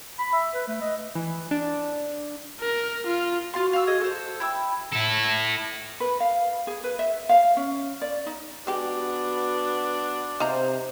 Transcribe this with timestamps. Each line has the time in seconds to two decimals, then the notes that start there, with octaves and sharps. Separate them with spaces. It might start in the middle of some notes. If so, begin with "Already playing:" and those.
0.19 B5
0.33 E5
0.54 B4
0.68 A3
0.81 D#5
1.15 E3
1.51 D4
2.60 A#4
3.06 F4
3.54 F4 F#4 F5 C6
3.73 F5 E6
3.87 G#4 D#5
4.01 A4 C5
4.40 E4 G5 E6
4.92 E4 A4
6.00 B4
6.20 F5
6.67 G#4
6.84 B4
6.99 E5
7.29 F5
7.57 C#4
8.02 D5
8.26 D#4
8.67 G#3 B3 D4 F#4 G4
10.40 C3 D#4 C5 F5 A#5